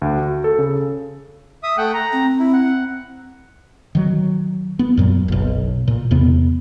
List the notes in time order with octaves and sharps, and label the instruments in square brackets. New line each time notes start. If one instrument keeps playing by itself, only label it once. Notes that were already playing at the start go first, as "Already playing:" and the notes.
[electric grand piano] D2
F#4
A4
C#3
[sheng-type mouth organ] E5 D#6
A3 F#5 G5
A#5
[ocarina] C4
[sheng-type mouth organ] E4
F#5
[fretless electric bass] D#3 F#3
B3
F#2 A#2 F#3
F#1 B1
A#2
E2 C3 B3